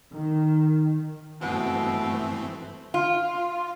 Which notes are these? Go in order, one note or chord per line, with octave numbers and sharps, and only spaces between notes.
D#3
G2 B2 E3 A3 C4
F4